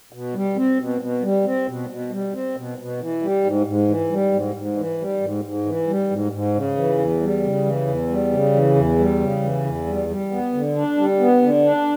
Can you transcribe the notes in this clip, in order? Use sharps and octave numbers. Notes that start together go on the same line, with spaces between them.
B2
G3
C4
B2
B2
G3
C4
B2
B2
G3
C4
B2
B2
E3
G3
G#2
G#2
E3
G3
G#2
G#2
E3
G3
G#2
G#2
E3
G3
G#2
G#2
C#3
E3
E2
G3
C#3
E3
E2
G3
C#3
E3
E2
G3
C#3
E3
E2
G3
G3
B3
D3
D4
G3
B3
D3
D4